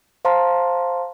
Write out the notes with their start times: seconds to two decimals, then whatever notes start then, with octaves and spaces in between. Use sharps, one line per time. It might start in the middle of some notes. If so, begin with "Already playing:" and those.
0.25 C5 F5 A5 A#5 C6